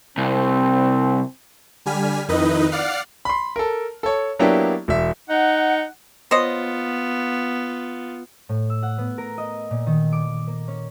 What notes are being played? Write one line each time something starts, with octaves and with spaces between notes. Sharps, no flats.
C2 C4
D3 G3 G#5 F6 B6
F2 D#3 D#4 E4 B4 D#5
D5 F5 F#5 F6 C7
B5 C6
A4 A#4
A4 C#5
F#3 A#3 B3 D4 E4 G4
E1 E5
D#4 F#5
B3 F4 C5 C#5 D#5
A2
E6
F#5
B3
A#4
D#5
A#2
D#3
D6
A#3
C#4